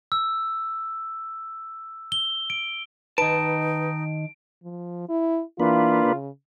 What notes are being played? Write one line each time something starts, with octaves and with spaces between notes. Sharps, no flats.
E6
G7
D7
D#3 D#4 B4 A5 D7
F3
E4
E3 A#3 D4 F4 B4
C#3